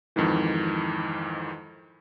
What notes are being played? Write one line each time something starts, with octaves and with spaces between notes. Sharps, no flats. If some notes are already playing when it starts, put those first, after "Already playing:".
F2 G#2 D#3 E3